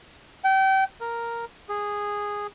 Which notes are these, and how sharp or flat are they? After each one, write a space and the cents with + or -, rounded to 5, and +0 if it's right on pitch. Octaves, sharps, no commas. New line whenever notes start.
G5 -30
A#4 +0
G#4 -10